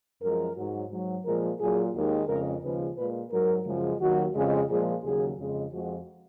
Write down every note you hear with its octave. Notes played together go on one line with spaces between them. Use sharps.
F#2 F3 G#3 A#4
G#2 F#3
G#2 F#3
A#2 F3 G#3 A#4
A#2 F#3 G#4
D#2 D#3 G#3
F2 C#3 G#3 A#4
D#2 C#3 F3 G#3 B4
A#2 G#3 B4
G#2 F#3 A#4
F#2 C#3 F3 G#3
D#2 D#3 F#3 F#4
F2 C#3 G#3
A#2 F3 G#3 G#4
D#2 C#3 F#3 G#4
F2 C#3 G#3
F2 F3 G#3 F#4